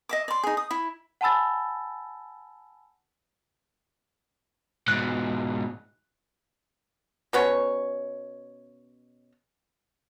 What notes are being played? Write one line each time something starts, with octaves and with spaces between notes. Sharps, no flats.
D#5 E5 D6
D5 C6
D#4 G#4
D#6
E4
F#5 G#5 A5 B5 E6 A6
G#2 B2 F#6
B2 B3 C#4 C#5